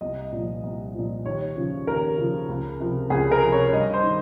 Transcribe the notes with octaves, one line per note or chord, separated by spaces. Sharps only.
C2 D#5
A#2 F3
C2
A#2 F3
D#2 C#5
C#3 F3
D#2 A#4
C#3 F3
C#2
C3 F3
C#2 G#4
A#4
C3 F3
C#5
G2 D#5
C5
D#3